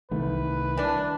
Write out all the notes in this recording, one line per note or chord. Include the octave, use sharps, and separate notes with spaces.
C2 D#3 A3 B4
E3 D4